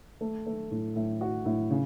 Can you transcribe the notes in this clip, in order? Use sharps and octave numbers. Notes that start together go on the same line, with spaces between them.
A3
A3
A2
A2
F#4
A2
C#3